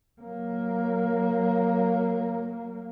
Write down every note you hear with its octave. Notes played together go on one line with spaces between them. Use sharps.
F#3 A#3